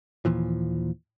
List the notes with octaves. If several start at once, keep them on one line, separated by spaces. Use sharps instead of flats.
D#2 A#2 E3 F3